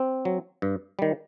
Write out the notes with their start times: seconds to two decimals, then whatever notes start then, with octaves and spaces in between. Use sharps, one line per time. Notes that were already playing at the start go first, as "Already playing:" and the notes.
Already playing: C4
0.25 F#3
0.62 G2
0.99 D#3 G3